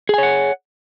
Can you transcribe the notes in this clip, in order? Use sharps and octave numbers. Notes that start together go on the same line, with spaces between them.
G#4 C#5 F#5 G#5